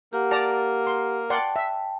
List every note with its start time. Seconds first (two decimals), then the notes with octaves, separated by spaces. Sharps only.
0.13 A#3 G4 A#4 F#5
0.31 D5 A5 A#5
0.87 C6
1.30 D5 F#5 G5 A5 C6
1.56 E5